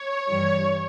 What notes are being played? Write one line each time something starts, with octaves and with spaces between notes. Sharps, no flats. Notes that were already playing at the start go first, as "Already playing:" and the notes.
Already playing: C#5
G2 E3 G3